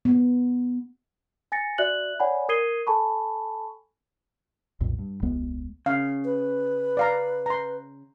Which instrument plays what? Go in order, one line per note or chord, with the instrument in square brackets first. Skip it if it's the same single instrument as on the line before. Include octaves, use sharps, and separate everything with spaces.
[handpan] B3
[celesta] G#5 A6 A#6 C#7
F#4 D5 E5 F#6 F#7
C#5 D5 F#5 G#5 B5
A#4 D#6 G#6 C7 D#7 G7
A4 G#5 A5 B5 C#6
[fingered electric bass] B1 F2 A#2
G2
E1 C#2 G#3 B3
[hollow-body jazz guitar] C#3 [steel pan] F5
[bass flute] B4
[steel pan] D5 F5 A#5
A#5 C6